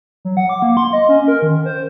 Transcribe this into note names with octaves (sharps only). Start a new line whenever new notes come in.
F#3
F#5
D6
A#3
C6
D#5
C#4
A#4
D#3
C5